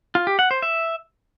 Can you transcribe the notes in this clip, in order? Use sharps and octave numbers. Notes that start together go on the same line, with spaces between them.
F4
G4
F#5
C5
E5